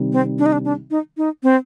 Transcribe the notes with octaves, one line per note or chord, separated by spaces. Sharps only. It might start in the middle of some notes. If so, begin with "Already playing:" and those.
Already playing: C3 D#3 G3
C4
D4
D#4
D4
D4
D#4
D#4
C4